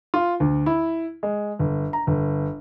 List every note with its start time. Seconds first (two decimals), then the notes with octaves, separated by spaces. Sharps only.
0.14 F4
0.40 D2
0.66 E4
1.23 G#3
1.59 G1
1.93 A#5
2.07 G1